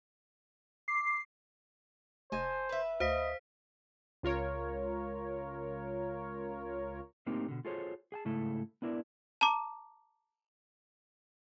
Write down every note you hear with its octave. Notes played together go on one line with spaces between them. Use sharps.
D6 C7
F1 C5 D#5 G#5 A5
B4 E5
D2 C5 D#5 F5 B6
C#2 F4 A#4 C#5
A2 A#3 C4 D#4 G4 A#4
B2 D3
F4 F#4 G#4 A4 C5 C#5
G#4 G5 A5
G#2 C#3 A3 E4 A4 A5
B3 D4 E4 A#4 D5
A5 A#5 D6